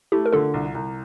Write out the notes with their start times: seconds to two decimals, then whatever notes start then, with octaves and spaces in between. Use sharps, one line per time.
0.12 A3 E4 G4
0.26 A#4
0.33 D3 F4 A4
0.54 C2
0.75 C2